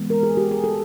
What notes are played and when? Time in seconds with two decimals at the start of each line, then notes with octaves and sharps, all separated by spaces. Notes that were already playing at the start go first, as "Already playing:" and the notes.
Already playing: E3 G#3 B3
0.10 A#4
0.23 G#4
0.37 G4
0.51 G#4
0.64 A4